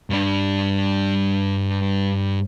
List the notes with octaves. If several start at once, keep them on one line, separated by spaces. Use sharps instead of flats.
G2 D4